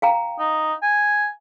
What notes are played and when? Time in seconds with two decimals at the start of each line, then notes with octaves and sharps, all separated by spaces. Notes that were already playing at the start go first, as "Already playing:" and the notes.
0.02 F5 G5 A#5
0.39 D#4
0.83 G#5